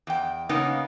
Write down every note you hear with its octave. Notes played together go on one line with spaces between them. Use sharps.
E2 G5
C#3 A#3 B3 C#4 D#4